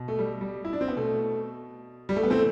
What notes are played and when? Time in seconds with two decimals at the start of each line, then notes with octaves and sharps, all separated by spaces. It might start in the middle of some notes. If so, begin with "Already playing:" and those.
Already playing: B2
0.08 A3
0.19 G3
0.41 G3
0.65 E4
0.73 D4
0.81 C4
0.88 B3
0.96 B2 A3
2.09 G3
2.16 A3
2.23 B3
2.30 A2 E3 A3 C4